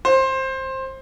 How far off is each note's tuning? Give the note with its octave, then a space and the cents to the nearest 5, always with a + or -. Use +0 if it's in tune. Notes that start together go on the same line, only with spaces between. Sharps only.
C5 +15